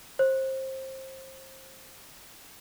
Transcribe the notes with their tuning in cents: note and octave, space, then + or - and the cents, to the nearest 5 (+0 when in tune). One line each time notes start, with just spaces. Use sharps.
C5 +25